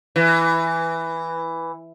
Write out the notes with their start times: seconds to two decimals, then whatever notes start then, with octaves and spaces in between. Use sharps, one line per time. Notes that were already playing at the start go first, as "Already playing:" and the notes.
0.16 E3